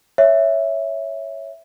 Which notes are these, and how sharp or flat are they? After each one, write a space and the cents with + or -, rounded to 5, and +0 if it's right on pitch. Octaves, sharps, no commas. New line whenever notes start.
C#5 +0 E5 +0